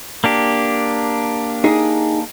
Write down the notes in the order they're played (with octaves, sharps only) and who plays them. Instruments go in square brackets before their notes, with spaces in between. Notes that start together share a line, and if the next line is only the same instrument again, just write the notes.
[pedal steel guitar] A#3 D4 G4
[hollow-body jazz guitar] D#4 G#4